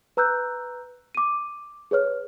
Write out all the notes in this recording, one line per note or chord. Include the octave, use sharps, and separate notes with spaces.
B4 A#5 E6 F#6 G6
D6 D#7
G#4 B4 C#5 F6